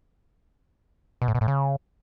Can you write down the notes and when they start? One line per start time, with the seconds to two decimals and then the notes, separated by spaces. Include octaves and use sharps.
1.22 B2
1.28 A2
1.35 B2
1.41 A2
1.48 C#3